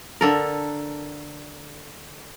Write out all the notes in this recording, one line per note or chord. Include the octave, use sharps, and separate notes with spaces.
D3 A4 A#4